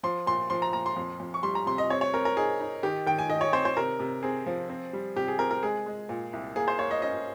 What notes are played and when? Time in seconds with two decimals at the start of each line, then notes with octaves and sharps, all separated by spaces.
0.03 F3 C6
0.27 A#2 C6
0.50 F3 C6
0.62 A#5
0.73 A#2 A#5
0.86 C6
0.97 F2
1.20 F2
1.34 C#6
1.43 G3 C6
1.55 A#5
1.66 C3 C6
1.78 D#5
1.90 C4 C#5
2.01 C#5
2.13 C4 A#4
2.25 A#4
2.37 D#4 G#4
2.60 D#4
2.83 D#3 G4
3.06 D#3 G5
3.19 G#5
3.29 D#3 D#5
3.41 C#5
3.53 C4 C5
3.65 C5
3.77 C3 A#4
4.00 C3
4.23 C4 G#4
4.46 F3
4.69 C4
4.93 G3
5.16 C3 G4
5.28 G#4
5.39 C4 A#4
5.51 A#4
5.63 G#3 G#4
5.86 G#3
6.09 A#2
6.33 C2
6.56 A#3 G#4
6.68 C5
6.79 A#3 C#5
6.91 D#5
7.02 C#4 D#5